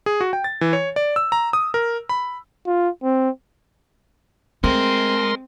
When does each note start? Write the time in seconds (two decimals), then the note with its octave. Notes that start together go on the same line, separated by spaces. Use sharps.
0.06 G#4
0.21 F#4
0.33 G5
0.44 A6
0.61 E3
0.73 C#5
0.96 D5
1.16 E6
1.32 A#5
1.53 D#6
1.74 A#4
2.09 B5
2.66 F4
3.03 C4
4.64 G#3 A3 C4 A#4 C6